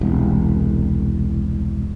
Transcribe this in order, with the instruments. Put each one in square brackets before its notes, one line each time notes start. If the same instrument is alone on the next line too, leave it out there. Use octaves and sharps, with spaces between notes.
[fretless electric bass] E1 C2